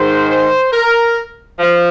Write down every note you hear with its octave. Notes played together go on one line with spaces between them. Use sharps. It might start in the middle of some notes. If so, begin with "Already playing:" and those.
Already playing: G#2 D#3 C5
C5
A#4
F3